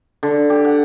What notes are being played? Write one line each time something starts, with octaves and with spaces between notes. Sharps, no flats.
D3
G4
F#5